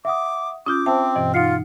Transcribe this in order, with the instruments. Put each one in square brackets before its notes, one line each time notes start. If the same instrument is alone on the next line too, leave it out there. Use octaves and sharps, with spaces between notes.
[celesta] E5 F#5 D#6 [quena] D6
[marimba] C#4 F4 [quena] D6 [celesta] D#6 G6
[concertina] C4 [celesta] C5 E5 [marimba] A5
[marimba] G2 B2 E3 [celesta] D#5
[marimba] D#4 F#5 [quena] F4 [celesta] F6 C7 C#7